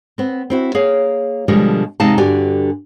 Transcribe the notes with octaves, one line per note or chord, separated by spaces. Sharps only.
B3 C4
C4 E4 F#4
A#3 G#4 C#5 F5
B2 D3 F3 G3 G#3
E2 C3 G#3 D#4 F5 A5
G2 D3 F#4 G4 D5 G#5